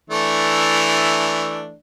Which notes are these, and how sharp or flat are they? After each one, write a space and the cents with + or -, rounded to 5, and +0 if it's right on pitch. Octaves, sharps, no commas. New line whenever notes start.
E3 +0 A3 +0 D4 +0